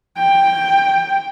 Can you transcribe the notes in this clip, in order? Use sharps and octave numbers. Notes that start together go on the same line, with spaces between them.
G5